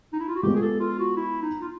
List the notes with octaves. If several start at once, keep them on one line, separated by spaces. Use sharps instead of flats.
D#4
E4
F4
F#4
F3 G#3 B3 G4
G#4
A4
F4
F#4
E4
D#4
F4